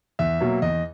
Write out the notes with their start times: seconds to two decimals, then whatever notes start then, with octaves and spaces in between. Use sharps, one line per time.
0.19 E2 E5
0.41 B2 F#3 A#3
0.62 E2 D#5